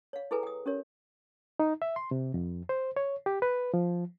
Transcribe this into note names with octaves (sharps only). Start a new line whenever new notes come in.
C#5 F5
E4 G#4 A4 B4 G#5 A#5
G5 D#6
C#4 G4 A#4 C#5
D#4
E5
C6
C3
F2
C5
C#5
G4
B4
F3